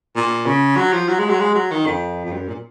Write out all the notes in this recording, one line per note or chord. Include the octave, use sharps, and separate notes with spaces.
A#2
C#3
F#3
F3
F#3
G#3
F#3
G#3
F#3
D#3
F2
F2
F#2
A#2